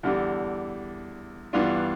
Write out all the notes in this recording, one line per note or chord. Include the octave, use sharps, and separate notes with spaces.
E2 D3 G3 D4
G2 E3 B3 D4 F4